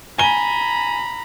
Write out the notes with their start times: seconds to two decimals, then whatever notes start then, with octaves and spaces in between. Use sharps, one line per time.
0.19 G#5 A#5 B5 G7